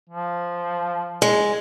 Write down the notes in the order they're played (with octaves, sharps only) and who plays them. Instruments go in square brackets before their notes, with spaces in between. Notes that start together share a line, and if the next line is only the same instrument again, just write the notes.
[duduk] F3
[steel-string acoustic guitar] G#3